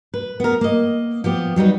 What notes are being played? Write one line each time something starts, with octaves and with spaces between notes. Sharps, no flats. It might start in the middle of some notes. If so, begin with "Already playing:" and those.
B4
B3 A#4
A#3 D#5
F3 B3 G4
F#3 G3 D#4 B4